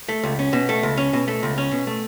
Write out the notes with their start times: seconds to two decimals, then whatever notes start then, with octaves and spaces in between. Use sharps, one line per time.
0.09 A3
0.23 C#2
0.39 C#4
0.53 B2
0.69 A3
0.83 C#2
0.98 C#4
1.13 B2
1.28 A3
1.43 C#2
1.58 C#4
1.71 B2
1.87 A3